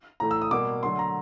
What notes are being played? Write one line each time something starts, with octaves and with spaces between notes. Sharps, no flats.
A2 E3 A3 A#5
E6
D#6
B2 G3 A#3 D6
D3 F#3 A3 C6
A#5